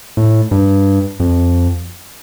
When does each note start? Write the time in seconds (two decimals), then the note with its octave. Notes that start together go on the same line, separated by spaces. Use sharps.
0.17 A2
0.51 G2
1.20 F2